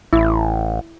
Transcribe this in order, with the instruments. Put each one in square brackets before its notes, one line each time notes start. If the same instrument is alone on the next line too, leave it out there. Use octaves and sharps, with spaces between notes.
[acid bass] A1 [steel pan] E4